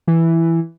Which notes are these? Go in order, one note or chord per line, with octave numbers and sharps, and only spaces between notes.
E3